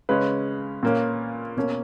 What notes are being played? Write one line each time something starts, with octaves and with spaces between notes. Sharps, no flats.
C#3 G#3 C#4 B4
A#2 A#3 C#4
B2 A#3 C#4